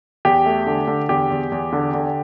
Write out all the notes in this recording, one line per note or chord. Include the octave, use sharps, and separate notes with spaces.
E2 G4
A3
D3
D3
E2 G4
E2
E2
D3
D3